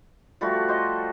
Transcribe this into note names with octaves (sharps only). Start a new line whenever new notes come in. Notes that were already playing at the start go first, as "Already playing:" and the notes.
F3 G3 A3 F#4
C5 D#5